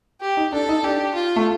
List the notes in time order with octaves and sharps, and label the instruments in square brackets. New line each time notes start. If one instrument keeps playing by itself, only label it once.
[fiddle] G4
[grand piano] D#4
[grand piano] D4 [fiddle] A4
[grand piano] D#4
[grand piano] D4 [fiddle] G4
[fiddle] F4
[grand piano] A3